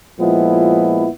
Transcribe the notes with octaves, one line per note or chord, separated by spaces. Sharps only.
A#2 F3 G#3 B3 E4